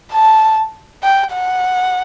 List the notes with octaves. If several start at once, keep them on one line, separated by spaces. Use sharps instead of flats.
A5
G5
F#5